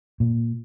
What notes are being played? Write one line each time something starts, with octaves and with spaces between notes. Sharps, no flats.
A#2